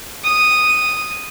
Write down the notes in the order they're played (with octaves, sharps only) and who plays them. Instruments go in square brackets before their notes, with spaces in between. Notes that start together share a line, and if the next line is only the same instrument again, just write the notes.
[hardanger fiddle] D#6